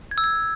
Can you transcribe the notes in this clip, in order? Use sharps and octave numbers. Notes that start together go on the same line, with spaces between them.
G#6
E6
G#6